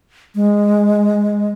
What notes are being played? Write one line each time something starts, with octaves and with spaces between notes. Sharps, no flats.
G#3